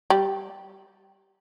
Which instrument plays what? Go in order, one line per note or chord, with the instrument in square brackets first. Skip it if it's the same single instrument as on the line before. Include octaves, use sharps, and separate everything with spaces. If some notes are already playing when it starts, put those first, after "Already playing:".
[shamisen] G3